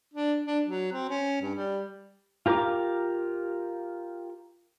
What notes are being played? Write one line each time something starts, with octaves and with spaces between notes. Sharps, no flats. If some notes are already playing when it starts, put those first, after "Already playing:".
D4
D4
F#3
C4
C#4
G2
G3
F4 G4 A#4 A#5 D6